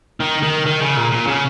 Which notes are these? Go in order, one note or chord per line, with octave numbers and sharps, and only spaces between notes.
D#3
D#3
D#3
C#3
A#2
A#2
C#3